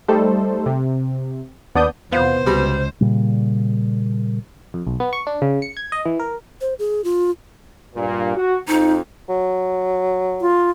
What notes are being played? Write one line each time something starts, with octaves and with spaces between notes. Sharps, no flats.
G3 A3 D#4 A4 C5
C3
D#2 B3 D4 D5 D#6 G6
E2 C3 B3 F4 C5
C#2 B2 G3
A#2 C#3 G3
F2
B1
B3
C#6
D4
C#3
C#7
G#6
D#5
E3
A#4
C5
G#4
F4
G2 A#2
F#4
F2 D#4
F#3
F4